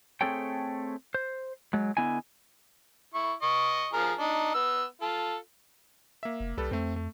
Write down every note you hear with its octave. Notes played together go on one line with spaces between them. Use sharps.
A3 C4 G#4 A4 C#5 G5
C5
F#3 G#3
D3 B3 E4 D#5 G#5
E4 C#6
D#5 C#6
F3 G#4 A#4
D4 D#4
B3 E6
F4 A4
A#3 E5
F1
C2 G3 A4 B4
F2 A3 C4
A3